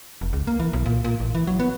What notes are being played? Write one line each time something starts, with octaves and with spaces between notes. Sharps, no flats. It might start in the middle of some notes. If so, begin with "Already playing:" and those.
F1
C#2
A#3
E3
B1
A#2
A#2
A1
E3
F#3
B3